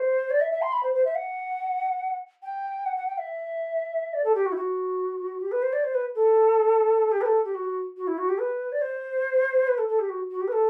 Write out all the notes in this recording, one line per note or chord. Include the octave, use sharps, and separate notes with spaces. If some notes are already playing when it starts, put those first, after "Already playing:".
Already playing: C5
D5
E5
E5
C6
B5
C5
C5
E5
F#5
G5
F#5
F#5
G5
E5
D5
A4
G4
F#4
E4
F#4
G4
B4
C5
D5
C5
B4
A4
G4
B4
A4
G4
F#4
F#4
E4
F#4
G4
B4
D5
C5
B4
A4
A4
G4
F#4
F#4
G4
B4
A4